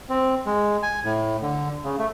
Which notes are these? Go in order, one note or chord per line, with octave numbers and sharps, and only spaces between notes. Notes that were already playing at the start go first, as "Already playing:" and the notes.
C4
G#3
G#5
A2
D3
C#3
A3